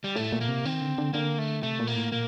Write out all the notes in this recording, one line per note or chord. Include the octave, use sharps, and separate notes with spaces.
G3
A2 A3
A#2
A#3
C3
D#3 C4
D3
D3
D3 A#3
A3
C3 A3
A#2
A#3
A2
A#2 A#3